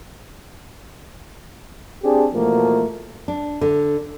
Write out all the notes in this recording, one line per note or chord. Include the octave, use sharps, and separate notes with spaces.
C4 D4 G4 G#4
B2 E3 F3 A3 A#3
D4
D3